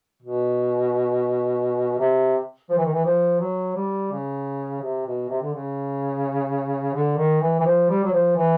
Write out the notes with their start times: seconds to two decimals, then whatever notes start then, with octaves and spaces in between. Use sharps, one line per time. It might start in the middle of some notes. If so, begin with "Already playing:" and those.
0.22 B2
1.99 C3
2.70 F3
2.77 E3
2.85 D#3
2.93 E3
3.05 F3
3.40 F#3
3.76 G3
4.12 C#3
4.81 C3
5.06 B2
5.29 C3
5.42 D3
5.53 C#3
6.94 D3
7.17 D#3
7.41 E3
7.59 E3
7.65 F3
7.89 G3
8.04 F#3
8.12 F3
8.36 E3